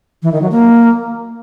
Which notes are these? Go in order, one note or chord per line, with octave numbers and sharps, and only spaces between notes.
E3
D#3
F#3
A#3